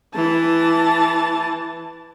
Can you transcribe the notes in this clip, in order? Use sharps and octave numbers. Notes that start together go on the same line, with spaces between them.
E3 A5